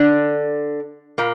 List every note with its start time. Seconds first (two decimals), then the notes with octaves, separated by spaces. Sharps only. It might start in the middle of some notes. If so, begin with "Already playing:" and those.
Already playing: D3 D4
1.18 A#2 A#3